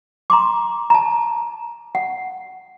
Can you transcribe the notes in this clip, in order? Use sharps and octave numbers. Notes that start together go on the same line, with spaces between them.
A#5 C6 D6
A5 A#5
F#5